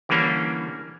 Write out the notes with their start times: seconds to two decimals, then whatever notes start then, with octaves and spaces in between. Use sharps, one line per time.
0.09 D3 E3 G3 A#3 C#4 D4